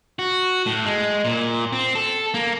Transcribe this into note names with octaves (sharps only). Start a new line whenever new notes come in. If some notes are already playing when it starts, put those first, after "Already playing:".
F#4
A2
G#3
A#2
C4
A4
A#3